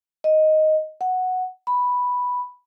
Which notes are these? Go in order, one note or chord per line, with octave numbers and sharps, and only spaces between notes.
D#5
F#5
B5